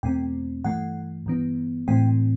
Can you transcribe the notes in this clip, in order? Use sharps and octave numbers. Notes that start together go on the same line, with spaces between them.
E2 B2 A3 C4 G5
G2 E3 A3 F#5
G2 E3 B3
A2 E3 A3 C4 G5